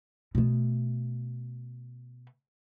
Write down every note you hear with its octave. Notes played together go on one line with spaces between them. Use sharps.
B2 A3